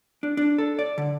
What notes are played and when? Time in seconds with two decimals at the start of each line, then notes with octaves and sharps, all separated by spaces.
0.23 D4
0.37 D4
0.58 A4
0.79 D5
0.98 D3